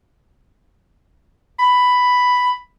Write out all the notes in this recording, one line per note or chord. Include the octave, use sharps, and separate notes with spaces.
B5